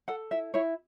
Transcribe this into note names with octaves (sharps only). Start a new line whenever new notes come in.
A4 F#5
E4 E5
E4 C#5